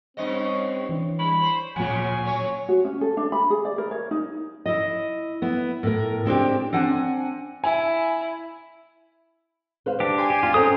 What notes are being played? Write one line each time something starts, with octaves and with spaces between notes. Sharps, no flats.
G2 C4 C#4 D#5
E3 D4
G3 B5
C5
D1 A#2 C#3 F3 G#5
F#3 C#4 C#5
F#4
C#4
A4
D4
B5
G#4
D5
A#4
C#5
D#4
E4 D#5
B3 E4
A2 A#4
G#3 C4 D4 G4
C4 D4 F#5 G#5
E4 G#5
B4 C5 F5
D4 G4
G#5 C6
G4
D4 F4
C#4 A4 C5 G5 A#5 D#6